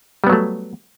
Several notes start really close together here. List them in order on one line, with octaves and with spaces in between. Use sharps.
G3 B3 F#3 A3